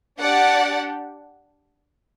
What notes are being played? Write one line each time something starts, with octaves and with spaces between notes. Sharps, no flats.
D4 G4 D5 F#5